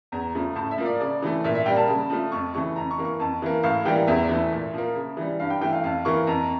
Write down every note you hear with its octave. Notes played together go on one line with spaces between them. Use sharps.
E2 A#5
C#3 F3 A3
A2 A5
E5
F3 A#3
D5
C#3 D5
E3 A3
A#2 E5
E5
G3 A#3 G5
A5
C#3
F3 A3
F2 C#6
C#3 E3 A3 C#6
F2 A#5
C#6
E3 A#3
C#6
F2 A5
E3 A#3
A2 F5
E3 G3 A#3 G5
E2 E5
E3 A3
A#2
F3 A#3
C#3
E3 G3
G2 F5
G5
E3 A3 G5
F5
F2 F5
E3 A#3 C#6
F2 A#5